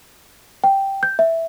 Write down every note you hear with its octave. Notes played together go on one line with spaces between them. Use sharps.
G5
G6
E5